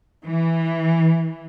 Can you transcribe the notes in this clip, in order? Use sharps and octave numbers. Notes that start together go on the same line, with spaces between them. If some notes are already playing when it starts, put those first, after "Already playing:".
E3